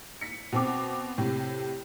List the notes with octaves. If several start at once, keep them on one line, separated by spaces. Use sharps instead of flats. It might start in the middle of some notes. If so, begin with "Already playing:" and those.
B6 C#7
B2 C4 D6
A2 C3